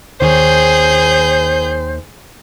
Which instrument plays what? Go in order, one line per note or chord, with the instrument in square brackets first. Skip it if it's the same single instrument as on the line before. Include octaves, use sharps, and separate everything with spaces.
[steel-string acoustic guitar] D#2 D#3 C#5 [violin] G#4 G6 [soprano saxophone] C5